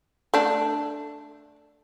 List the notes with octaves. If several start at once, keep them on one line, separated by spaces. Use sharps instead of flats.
A3 D4